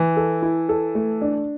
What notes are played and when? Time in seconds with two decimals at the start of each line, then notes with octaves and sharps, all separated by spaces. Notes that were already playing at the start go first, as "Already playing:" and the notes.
Already playing: E3 E4
0.17 A4
0.42 E4
0.69 A4
0.95 A3
1.22 D4